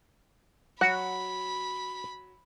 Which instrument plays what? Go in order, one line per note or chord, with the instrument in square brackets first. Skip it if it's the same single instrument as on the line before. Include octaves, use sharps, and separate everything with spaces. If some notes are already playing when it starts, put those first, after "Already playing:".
[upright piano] F#3 [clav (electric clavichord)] F#4 [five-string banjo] F#5 [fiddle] B5